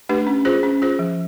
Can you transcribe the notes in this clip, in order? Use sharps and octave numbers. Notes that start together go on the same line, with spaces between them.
A3 D4 G4 B4
C#4
F4 G#4 C5
C#4
F4 G#4 C5
F3